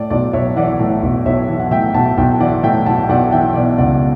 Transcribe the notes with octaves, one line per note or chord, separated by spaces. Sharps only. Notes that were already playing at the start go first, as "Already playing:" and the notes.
Already playing: A2 D5
B1 D5
B1 C#5 E5
E3 D5 F#5
A2
B1
B1 C#5 E5
E3
F#5
A2 E5 G5
B1 F#5 A5
B1 E5 G5
E3 D5 F#5
A2 E5 G5
B1 F#5 A5
G5
B1 D5 F#5
E3 E5 G5
B2 D5
C#2 D5 F#5